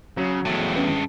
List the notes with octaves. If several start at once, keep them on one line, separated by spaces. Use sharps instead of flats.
C#3 F#3
E2 G2 G#3 A3
C#4 B4